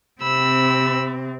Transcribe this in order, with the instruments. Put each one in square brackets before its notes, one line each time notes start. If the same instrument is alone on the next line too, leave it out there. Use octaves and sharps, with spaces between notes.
[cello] C3 C4 [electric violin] B5 E6